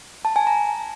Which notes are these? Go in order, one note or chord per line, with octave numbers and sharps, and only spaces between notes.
A5
G#5
A#5